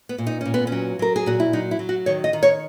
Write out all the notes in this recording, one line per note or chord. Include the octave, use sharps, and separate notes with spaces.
B3
A#2
D#4
A#2 C#4
B3
C#4
F#3
F#3 A#4
G#4
A#2 F#4
E4
F#3 D#4
E4
F#3
F#4
D#3 C#5
D#5
D#3
C#5